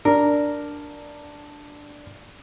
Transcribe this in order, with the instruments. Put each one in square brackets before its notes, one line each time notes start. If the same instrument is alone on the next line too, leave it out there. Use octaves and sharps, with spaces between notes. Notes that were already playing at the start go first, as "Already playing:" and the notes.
[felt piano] D4 [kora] A#4